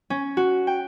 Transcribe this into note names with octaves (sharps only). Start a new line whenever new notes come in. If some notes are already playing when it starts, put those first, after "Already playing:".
C#4
F#4
G5